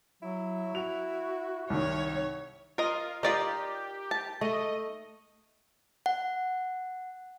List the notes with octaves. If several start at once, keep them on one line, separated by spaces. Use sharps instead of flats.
F#3 E4
F#4 F7
C2 D#3 C#5
F4 A#4 D#5
D#4 F4 G4 A#4 D5 D#5
A5
A3 D#5
F#5